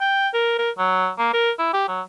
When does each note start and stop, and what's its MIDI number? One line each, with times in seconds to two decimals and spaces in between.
0.01 0.28 79
0.33 0.54 70
0.58 0.70 70
0.78 1.10 54
1.18 1.33 58
1.33 1.51 70
1.59 1.72 64
1.73 1.84 67
1.88 2.01 54